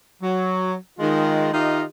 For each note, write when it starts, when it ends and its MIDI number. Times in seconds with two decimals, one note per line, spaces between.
0.23 0.74 54
0.99 1.53 51
0.99 1.53 56
0.99 1.53 65
1.53 1.83 51
1.53 1.83 63
1.53 1.83 65
1.53 1.83 67
1.53 1.83 75
1.53 1.83 76